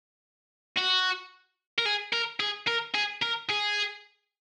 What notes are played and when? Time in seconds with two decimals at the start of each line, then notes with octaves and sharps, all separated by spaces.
0.78 F#4
1.79 A#4
1.86 G#4
2.13 A#4
2.40 G#4
2.67 A#4
2.94 G#4
3.22 A#4
3.49 G#4